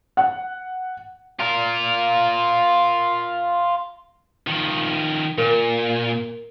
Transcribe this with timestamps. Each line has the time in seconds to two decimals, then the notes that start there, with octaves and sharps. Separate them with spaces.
0.17 F#5
1.40 F4 A#4
4.47 D#3 F3
5.38 A#2 A#4